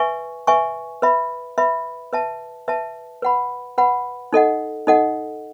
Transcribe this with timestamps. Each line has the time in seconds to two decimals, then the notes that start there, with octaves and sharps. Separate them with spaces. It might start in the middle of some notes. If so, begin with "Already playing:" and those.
Already playing: B4 E5 G#5 C#6
0.47 B4 E5 G#5 C#6
1.02 B4 E5 B5
1.58 B4 E5 B5
2.13 B4 E5 A5
2.68 B4 E5 A5
3.22 B4 F#5 B5
3.78 B4 F#5 B5
4.33 D#4 A4 D#5 F#5
4.87 D#4 A4 D#5 F#5